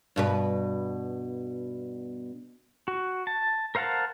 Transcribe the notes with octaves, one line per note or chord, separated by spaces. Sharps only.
G2 B2 B4
F#4
A5
A#4 C5 F5 F#5 A5